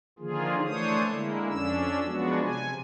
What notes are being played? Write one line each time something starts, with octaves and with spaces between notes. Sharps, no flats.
D3 D#3 F3 A#3 F4 G#4
E3 A3 D4 C5 C#5 D#6
D3 G#3 A#3 E4
F2 C#4 D4 E6
F3 F#3 G#3 B3 D4 F#4
C3 G#5